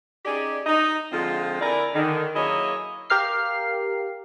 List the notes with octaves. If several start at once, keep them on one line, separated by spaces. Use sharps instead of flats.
C#4 D#4 G4 G#4 D5
D#4
D3 F3 G#3 C4 F4
D3 E4 A#4 D5 G#5 A#5
D3 D#3
F#3 A#3 E4 G#4 C#5 D#5
G4 A#4 F5 C7